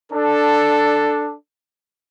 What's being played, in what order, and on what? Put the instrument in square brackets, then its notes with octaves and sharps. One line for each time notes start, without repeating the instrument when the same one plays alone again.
[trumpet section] D4 A4